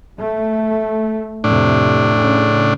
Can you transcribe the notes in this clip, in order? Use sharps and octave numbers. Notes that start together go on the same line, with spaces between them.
A3
F2 A2 C3 D4
C#3